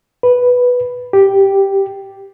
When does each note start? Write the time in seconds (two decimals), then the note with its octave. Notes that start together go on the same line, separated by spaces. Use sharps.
0.23 B4
1.13 G4